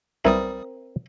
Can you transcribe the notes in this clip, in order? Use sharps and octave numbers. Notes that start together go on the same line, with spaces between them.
B1 G3 B3 C4 E4 A#4 D#6